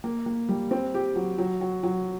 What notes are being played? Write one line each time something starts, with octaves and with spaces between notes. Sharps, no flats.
A#3
A#3
G3
C4
G4
F#3
F#3
F#3
F#3